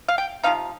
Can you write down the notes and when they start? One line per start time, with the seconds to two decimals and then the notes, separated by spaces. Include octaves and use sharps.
0.08 F5
0.18 G5
0.44 C3 F3 C4 D#4 F5